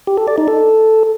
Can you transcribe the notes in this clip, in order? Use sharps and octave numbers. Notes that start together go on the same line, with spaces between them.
G4
A4
D5
D#4
A4